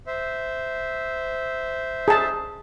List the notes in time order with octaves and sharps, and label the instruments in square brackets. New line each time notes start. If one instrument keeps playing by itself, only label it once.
[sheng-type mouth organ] C5 E5
[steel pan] G#4 A5